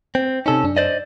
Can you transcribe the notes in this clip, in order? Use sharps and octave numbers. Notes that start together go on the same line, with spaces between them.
C4
C3 C#4 D#4 A4
F#2 D4
C5 D5 D#5